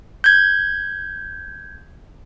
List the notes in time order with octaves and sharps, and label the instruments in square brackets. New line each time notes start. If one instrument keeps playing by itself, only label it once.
[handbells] G6 G#6